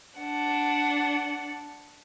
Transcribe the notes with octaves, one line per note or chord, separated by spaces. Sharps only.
D4 F#5